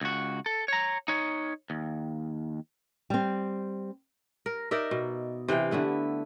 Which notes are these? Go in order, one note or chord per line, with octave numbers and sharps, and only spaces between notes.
C#2 F#4
A4
C#5 A#5
D#4 C#5
D#2
G3 C4
A#4
D#4 A#4 D5 E5
B2
C3 E3 F5 G5
D3 A3 B3 E4